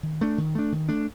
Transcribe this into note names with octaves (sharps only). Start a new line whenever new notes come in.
D#3
A3 D4
D#3
A3 D4
D#3
A3 D4